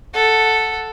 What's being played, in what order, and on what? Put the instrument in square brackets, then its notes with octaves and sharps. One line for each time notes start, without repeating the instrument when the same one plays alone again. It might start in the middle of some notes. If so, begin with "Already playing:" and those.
[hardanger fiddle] A4 F#5